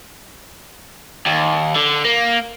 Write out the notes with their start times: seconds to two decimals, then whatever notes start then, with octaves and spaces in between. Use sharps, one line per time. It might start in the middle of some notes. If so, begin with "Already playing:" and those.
1.26 D#2
1.75 D3
2.05 A#3